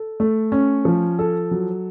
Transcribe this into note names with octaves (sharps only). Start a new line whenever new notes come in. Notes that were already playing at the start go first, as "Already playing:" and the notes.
Already playing: A4
A3
C#4
F3
A4
F#3